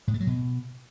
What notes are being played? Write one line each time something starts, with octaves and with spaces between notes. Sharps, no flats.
A2
A3
F#3
B2